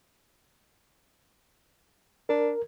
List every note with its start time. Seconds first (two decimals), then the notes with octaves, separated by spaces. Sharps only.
2.29 D4 A#4